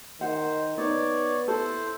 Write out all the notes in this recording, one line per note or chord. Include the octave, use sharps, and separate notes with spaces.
D#3 C5 F#5
B3 D#4 C#5 D5
E4 A4 C5